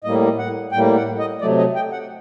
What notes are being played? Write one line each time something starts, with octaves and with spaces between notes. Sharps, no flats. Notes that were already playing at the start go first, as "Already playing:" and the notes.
A2 G3 A#3 D#5
F#5
A2 G3 A#3 G5
F#5
D#5
C3 F#3 A3 D5
D#5
G5
F#5